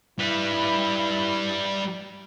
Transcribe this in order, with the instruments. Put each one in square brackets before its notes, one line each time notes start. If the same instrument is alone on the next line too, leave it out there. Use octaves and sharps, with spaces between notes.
[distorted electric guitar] G3 B4 [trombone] E4